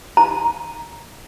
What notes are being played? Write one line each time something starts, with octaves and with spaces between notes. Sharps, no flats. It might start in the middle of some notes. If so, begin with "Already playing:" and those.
A#5